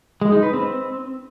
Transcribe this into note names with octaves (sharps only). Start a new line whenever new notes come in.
G#3
D#4
B4
C4